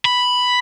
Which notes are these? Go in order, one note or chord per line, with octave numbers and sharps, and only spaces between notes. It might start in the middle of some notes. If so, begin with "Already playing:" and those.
B5